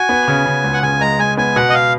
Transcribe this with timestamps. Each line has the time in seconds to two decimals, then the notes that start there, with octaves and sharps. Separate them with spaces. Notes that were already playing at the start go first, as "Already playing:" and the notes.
Already playing: F#4 G#5
0.09 B3
0.28 C#3
0.46 C#3
0.64 C#2
0.73 F#5
0.83 C#3 G#5
1.01 G#3 A#5
1.19 G#3 G#5
1.37 B3 G#5
1.56 B2 F#5
1.70 D#5
1.74 F5